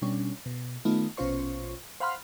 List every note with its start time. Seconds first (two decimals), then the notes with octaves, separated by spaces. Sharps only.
0.02 B2 G3 C#4 D4
0.46 B2
0.85 D#3 A3 B3 D#4 F4
1.17 A#1 B2 C#4 F4 C5 C#6
2.00 C5 F5 F#5 B5 C6 F6